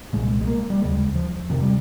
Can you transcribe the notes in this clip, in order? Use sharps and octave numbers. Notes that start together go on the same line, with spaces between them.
C2 A#2 G#3
G#3
A#3
G3
D#2 C#3 G#3
F3
F2 C3 D#3
G3